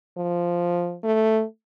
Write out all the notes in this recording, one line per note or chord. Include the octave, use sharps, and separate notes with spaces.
F3
A3